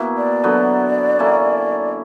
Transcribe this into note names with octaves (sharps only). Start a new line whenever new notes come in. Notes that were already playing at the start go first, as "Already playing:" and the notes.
Already playing: B2 A#3 E4
D5
D3 F#3 B3
D3 A#3 C#4 E4